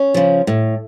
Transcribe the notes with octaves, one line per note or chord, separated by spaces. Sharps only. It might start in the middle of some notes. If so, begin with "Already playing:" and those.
Already playing: C#4
C#3 F3
A2